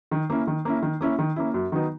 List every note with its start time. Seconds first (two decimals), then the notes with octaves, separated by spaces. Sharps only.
0.11 D#3
0.30 A#3 C#4 E4
0.47 D#3
0.65 A#3 C#4 E4
0.82 D#3
1.01 A#3 C#4 E4
1.19 D#3
1.36 A#3 C#4 E4
1.54 F#2
1.72 D#3 F#3 B3 D#4